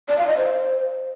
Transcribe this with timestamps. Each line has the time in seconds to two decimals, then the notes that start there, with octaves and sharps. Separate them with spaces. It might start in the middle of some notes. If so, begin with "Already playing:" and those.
0.08 D5
0.18 F5
0.28 D#5
0.37 C5